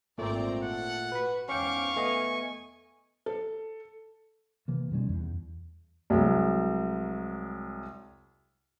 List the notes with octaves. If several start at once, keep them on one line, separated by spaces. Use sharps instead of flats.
G#1 A#2 A3 C4 D5 A#5
A4 F#5
F#4 B4 B5
E2 G#2 C#4 F5 G5 C#6 D6
A3 B3 D#5 G#5
A4
C3 E3 A#3
B2 D#3 G3 C#4
E2
C2 F#3 G#3